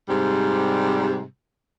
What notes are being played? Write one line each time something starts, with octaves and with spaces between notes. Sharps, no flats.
G#2 C3 G3